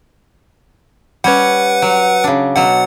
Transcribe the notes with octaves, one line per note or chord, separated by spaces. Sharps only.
G3 C#4 B4 C#5 F#5
F#3
C#3 D4
B2 F#3 F#5